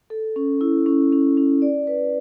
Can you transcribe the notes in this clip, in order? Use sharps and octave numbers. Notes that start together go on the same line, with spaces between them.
A4
C#4
E4
C#4
C#4
C#4
D5
B4